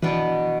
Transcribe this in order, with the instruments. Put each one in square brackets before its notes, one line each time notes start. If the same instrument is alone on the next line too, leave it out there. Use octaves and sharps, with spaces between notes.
[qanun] B2 B3 D4 B4 [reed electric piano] E3